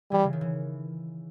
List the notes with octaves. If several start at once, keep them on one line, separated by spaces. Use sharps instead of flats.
E3 G3
C#3
D#3
E3